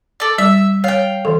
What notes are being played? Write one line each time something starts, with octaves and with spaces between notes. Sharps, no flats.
A4 D5
G3 E5
C#5 F5 G5
E3 A4